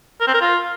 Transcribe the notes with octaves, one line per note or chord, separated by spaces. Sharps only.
A#4
C4
A#4
F4